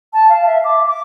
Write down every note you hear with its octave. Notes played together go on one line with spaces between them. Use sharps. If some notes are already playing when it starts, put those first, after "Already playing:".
A5
F5
E5
D6
D6